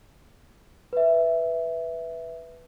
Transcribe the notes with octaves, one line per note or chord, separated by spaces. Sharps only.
B4 E5